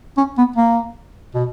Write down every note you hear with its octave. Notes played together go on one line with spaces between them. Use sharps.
C#4
B3
A#3
B2